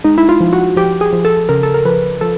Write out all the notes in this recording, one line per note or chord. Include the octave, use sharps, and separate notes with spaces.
G#3 D#4
E4
F4
F3
F#4
F3 G4
G#4
F3
A4
C#3 A#4
A4
A#4
F3 B4
F3 A4